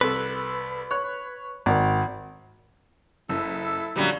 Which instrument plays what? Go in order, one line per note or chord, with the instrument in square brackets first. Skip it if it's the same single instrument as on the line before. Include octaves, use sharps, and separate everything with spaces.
[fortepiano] C2 A4 [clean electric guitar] B4
[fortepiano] C#5 F#6
[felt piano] G#1 [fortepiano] A#4 D5
[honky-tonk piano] F#1 [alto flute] E4 [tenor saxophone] A4
[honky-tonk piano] F#2 D3 [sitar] A#2 F#3 G3